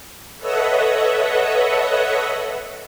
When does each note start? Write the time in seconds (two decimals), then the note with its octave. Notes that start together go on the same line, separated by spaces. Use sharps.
0.38 A4 B4 C#5 D#5 E5 F#5